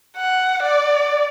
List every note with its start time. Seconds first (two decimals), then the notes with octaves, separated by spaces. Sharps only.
0.17 F#5
0.62 D5